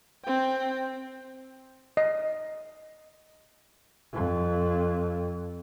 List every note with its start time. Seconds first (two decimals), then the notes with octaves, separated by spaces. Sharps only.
0.24 C4 G5
1.97 D#5
4.13 F2